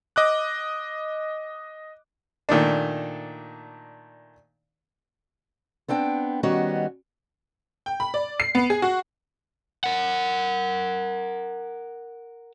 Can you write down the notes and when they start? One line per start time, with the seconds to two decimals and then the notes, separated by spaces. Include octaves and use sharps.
0.16 D#5 D6 F#6
2.49 A#2 D#3 A3 D4
5.88 B3 C4 D4 G5
6.43 D#3 G3 B3 C#4 F#4 D#5
7.86 G5
8.00 B5
8.14 D5
8.40 C7
8.55 B3
8.70 G#4
8.82 F#4
9.84 A#4 F#5